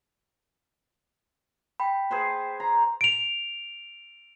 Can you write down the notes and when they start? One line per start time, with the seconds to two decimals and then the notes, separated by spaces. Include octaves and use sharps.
1.80 G5 B5
2.10 G#4 B4 C5
2.60 A#5
3.01 D7 F7